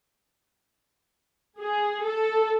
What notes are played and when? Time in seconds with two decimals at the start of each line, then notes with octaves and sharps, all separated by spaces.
1.58 G#4
2.03 A4